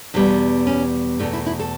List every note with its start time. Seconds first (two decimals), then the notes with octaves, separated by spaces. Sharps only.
0.14 E2 B2 G3 B3
0.67 C#4
1.19 E2 B2 A3 D4
1.33 E4
1.46 E4
1.59 A4